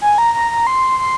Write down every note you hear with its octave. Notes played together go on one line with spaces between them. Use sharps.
G#5
A#5
A#5
A#5
C6
C6